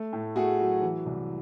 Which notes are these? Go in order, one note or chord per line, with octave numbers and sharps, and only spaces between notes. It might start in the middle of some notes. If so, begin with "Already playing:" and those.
Already playing: A3
A2
A3 F#4 G#4
F#3
E3
C2